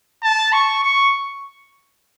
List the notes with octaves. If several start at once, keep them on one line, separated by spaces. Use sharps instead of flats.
A5
C#6
C#6